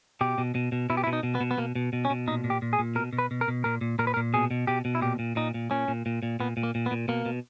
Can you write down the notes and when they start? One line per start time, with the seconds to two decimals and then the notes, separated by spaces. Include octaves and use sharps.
0.21 B2 G4
0.38 B2
0.55 B2
0.72 B2
0.90 B2 E4
0.97 G4
1.04 E4
1.07 B2
1.13 D#4
1.23 B2
1.35 B3
1.41 B2
1.51 B3
1.58 B2 A#3
1.75 B2
1.93 B2
2.05 C#4
2.10 B2
2.27 A#2 D#4
2.44 A#2
2.50 G4
2.62 A#2
2.73 G#4
2.79 A#2
2.95 B2 A#4
3.13 B2
3.19 B4
3.31 B2
3.41 A#4
3.48 B2
3.64 A#2 A#4
3.81 A#2
3.99 A#2 A#4
4.07 B4
4.14 A#4
4.17 A#2
4.34 B2 G#4
4.51 B2
4.67 B2 G4
4.85 B2
4.95 E4
5.02 A#2 G4
5.19 A#2
5.36 A#2 D#4
5.54 A#2
5.71 A#2 C#4
5.88 A#2
6.06 A#2
6.23 A#2
6.40 A#2 B3
6.57 A#2
6.63 A#3
6.75 A#2
6.86 B3
6.91 A#2
7.08 B2 A#3
7.26 B2